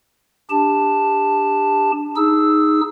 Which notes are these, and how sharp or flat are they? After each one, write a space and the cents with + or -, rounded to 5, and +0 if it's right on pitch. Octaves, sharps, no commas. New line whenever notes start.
D4 +0 G4 +20 A5 +0
D#4 +0 G#4 +0 E6 +0